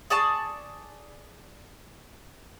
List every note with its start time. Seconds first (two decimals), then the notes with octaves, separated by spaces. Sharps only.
0.10 G#4 D5 A5 C#6